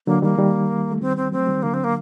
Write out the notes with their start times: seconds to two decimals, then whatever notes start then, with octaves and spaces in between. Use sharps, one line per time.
0.06 D3 F#3 A#3
0.22 D#3 G3 A#3
0.38 D#3 G3
0.91 A3
1.01 D#3 G3 C4
1.17 C4
1.32 F#3 A3 C4
1.47 D#3 G3
1.63 D3 F#3 A#3
1.74 C4
1.84 A#3